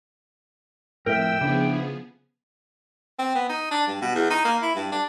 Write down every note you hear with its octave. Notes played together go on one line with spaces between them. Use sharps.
F2 A2 A#4 E5 G5 E6
C#3 F3 B3 D4 E4 G#4
C4
B3
D#4
D4
G2
B2
E2
D#4
A#3
E4
G2
D4